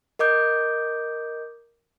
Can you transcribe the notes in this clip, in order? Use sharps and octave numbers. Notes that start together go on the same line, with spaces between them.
A#4 D#5 D6 G6